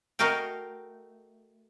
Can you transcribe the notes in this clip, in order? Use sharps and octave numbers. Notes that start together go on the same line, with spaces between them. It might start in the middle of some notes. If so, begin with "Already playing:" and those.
A3 F#4 A#4 D#5 F5 G5